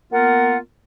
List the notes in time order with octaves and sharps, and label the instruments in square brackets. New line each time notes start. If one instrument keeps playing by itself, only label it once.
[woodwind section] A#3 B3 F4 A#4 F#5